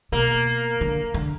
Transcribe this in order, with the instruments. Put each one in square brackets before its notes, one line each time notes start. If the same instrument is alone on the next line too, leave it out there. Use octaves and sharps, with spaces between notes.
[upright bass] B2 [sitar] A#3
[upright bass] D3
D3